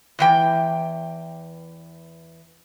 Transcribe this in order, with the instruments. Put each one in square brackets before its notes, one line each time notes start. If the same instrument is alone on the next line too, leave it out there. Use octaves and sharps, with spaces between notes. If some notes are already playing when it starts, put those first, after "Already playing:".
[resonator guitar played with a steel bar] E2 E3 G5